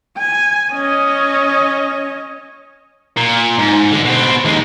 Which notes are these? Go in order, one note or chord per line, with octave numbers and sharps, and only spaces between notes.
G#5
C#4 D#5
A#2
G#2
D3 G#3
B2 C4
D#2 G#3